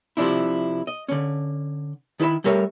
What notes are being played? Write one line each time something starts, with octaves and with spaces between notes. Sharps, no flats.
C3 F3 D4 E4
D#5
D3 C#4
D#3 E4 A#4 E5 B5
G3 A3 A#4 C#5 E5